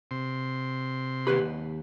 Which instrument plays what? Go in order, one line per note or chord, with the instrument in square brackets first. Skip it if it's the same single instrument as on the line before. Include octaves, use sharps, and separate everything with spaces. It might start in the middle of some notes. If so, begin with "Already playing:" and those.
[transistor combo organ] C3 C6
[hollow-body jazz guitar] D#2 B4 B5 [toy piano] G4